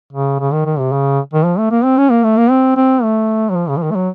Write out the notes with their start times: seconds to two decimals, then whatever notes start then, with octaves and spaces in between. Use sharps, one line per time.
0.12 C#3
0.39 C#3
0.52 D#3
0.65 D#3
0.78 C3
0.92 C#3
1.33 D#3
1.44 F3
1.58 A3
1.71 A#3
1.84 C4
1.97 C#4
2.10 A#3
2.24 A3
2.37 A#3
2.50 C4
2.76 C4
3.03 A3
3.49 F#3
3.55 F3
3.69 C#3
3.77 F3
3.83 D#3
3.91 A3
3.95 F#3